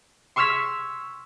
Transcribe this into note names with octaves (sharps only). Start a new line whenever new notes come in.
C6 C#6 E6 F6 G#6 B6